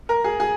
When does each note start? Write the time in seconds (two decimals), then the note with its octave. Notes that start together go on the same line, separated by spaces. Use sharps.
0.09 A#4
0.24 G#4
0.40 G#4